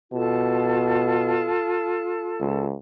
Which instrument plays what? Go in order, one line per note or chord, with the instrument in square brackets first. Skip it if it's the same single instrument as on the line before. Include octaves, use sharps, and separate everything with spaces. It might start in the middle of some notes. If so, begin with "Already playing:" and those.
[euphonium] B2 [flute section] F4 A4 A5
[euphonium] C#2